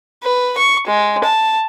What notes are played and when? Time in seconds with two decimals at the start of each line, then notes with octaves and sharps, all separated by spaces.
0.23 B4
0.58 C#6
0.87 G#3
1.24 A5